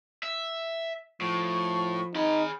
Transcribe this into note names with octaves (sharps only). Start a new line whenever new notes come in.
E5
A2 F3 C#6
D#4 G#4 B5